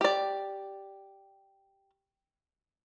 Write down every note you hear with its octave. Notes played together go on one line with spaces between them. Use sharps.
G4 D5